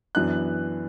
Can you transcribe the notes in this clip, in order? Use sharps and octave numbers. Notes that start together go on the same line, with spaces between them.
F#2 E3 B3 D4 F#6